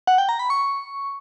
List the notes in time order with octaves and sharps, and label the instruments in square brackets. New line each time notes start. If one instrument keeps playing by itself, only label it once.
[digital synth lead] F#5
G5
A#5
B5
C#6